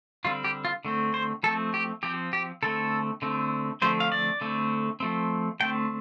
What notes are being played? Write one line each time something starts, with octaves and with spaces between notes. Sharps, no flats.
D3 G3 C4 F4
G4
F4
D3 A3 C4
C5
F3 A3 C4 A4
G4
F3 C4 G4
G4
D3 A3 C4 A4
D3 A3 C4
D3 F3 A3 C4 C5
F5
D5
D3 A3 C4
F3 A3 C4
D3 A3 C4 G5